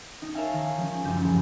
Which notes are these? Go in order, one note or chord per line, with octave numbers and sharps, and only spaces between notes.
D#4
A#4 C#5 E5 F5 G#5 A5
D#3
F3 G#3 C#4
G1 C#2 F#2 G6
A1